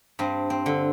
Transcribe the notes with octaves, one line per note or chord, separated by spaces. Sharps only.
G2 C4
C4
D3